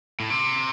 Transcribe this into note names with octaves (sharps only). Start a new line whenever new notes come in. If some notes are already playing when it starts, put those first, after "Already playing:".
A2
C3